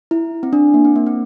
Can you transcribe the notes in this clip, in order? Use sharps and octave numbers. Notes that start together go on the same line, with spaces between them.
E4
C4
D4
A#3
C4
A#3
C4